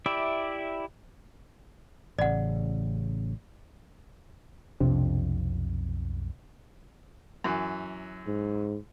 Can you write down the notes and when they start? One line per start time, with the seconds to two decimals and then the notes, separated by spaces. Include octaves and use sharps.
0.06 E4 G4 D5 E5
2.19 A1 C#3 D5 F#5
4.80 B1 F2 C3 D4
7.44 F#2 E3
8.27 G#2